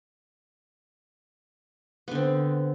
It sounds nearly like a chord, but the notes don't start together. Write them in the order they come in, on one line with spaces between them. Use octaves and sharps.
B3 D3 C4